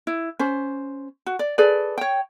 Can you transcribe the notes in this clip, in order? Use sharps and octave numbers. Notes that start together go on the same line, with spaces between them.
E4
C#4 C5
F#4
D5
G#4 A4 B4 D5
C#5 G5